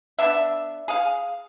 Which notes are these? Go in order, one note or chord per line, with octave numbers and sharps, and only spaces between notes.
B3 D4 E5
G#4 F5